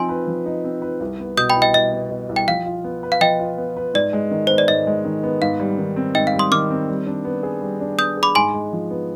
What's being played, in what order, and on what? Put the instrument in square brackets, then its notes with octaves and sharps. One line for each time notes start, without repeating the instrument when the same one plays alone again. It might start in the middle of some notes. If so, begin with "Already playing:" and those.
Already playing: [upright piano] F3 C4 D#4 [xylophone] G#5 C6
[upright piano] B4
F3
D#4
C4
B4
C2
B3
[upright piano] B2 [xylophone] D#6 G6
[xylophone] G5 B5
[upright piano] C2
[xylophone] D#5 G5
[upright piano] C2 [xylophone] D#5
[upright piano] B3
B2
C2
[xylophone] G5
[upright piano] F3 [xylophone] F5
[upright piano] F4
B3
B4
[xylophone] F5
[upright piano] F3 [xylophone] D#5 G5
[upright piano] F4
B3
B4
[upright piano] G#2 [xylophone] D5
[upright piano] G#3
D#3
[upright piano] B3 [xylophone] C5
[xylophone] D5
[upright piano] G#2 [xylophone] D#5
[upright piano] G#3
D#3
B3
[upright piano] G#2 [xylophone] F5
[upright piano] G3
D#3
C4
[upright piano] G#2 [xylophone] D#5 G5
[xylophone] F5
[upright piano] G3
[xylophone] C6 D#6
[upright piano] D#3 [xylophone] D6 F6
[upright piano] C4
G3
D4
B3
G#4
G3
D4
[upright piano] B3 [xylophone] D#6 G6
[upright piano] G#4
[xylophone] B5 D6
[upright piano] G#2 [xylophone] G#5 C6
[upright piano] G#3
F3
B3